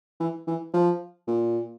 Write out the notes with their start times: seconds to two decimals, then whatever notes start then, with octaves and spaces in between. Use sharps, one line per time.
0.20 E3
0.47 E3
0.74 F3
1.28 A#2